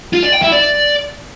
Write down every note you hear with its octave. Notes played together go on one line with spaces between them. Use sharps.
F4
D5
G5
E4
D5